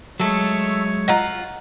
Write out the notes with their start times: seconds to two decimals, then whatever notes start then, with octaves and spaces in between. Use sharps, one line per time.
0.20 F#3 G#3 A3 A4 C#5
1.08 F4 D#5 F#5 A#5